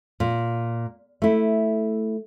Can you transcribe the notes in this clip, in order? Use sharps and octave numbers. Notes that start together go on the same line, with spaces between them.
A#2
A3 E4